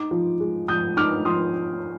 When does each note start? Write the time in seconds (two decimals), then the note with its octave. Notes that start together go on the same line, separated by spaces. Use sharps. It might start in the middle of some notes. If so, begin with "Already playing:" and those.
Already playing: D#4 D6
0.11 F3
0.40 G#3
0.68 F3 D#6 G6
0.97 D#4 D6 F6
1.25 F3 C6 D#6